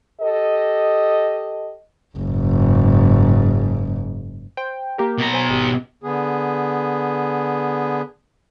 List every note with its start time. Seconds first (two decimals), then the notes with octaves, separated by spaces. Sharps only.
0.20 G4 A4 D#5
2.17 F#1 G#2
4.57 C5 G5
4.98 A#3 G4 A#4
5.18 B2 A#5
5.33 C5 G#5
5.49 G#1 G4
6.04 D3 B3 G#4